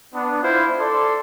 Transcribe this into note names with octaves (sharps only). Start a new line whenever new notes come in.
B3 D4
E4 F4 C5
A4 D5 C6